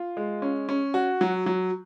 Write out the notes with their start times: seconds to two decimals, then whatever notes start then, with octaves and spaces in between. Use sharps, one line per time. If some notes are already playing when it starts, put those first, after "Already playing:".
Already playing: F4
0.17 G#3
0.42 C#4
0.69 C#4
0.94 F#4
1.21 F#3
1.46 F#3